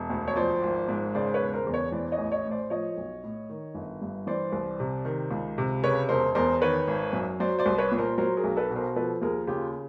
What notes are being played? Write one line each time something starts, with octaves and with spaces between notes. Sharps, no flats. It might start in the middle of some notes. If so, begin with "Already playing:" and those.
Already playing: E1
D2
C#5
F3 C5 D5
G#1
G#2
C#3 C5 D5
B4 C#5
E1
A#4 C5
E2
B4 C#5
E3 C5 D5
C#5 D#5
A1
C#5 D#5
A2
C5 D5
F3 C#5 D#5
B1
A2
D#3
G1
G2
E3 C5 D5
C2
C3
D#3
C#2
C3
C#3 B4 C#5
E1 A#4 C5
E2 A#4 C5
D#3 B4 C#5
G#1
F#2
F#3 C5 D5
C5 D5
C2
B4 C#5
A#2
A#4 C5
F#3 A#4 C5
G#4 A#4
B1
A4 B4
B2
A#4 C5
F3 A4 B4
D#2 G#4 A#4
C#3 F4 G4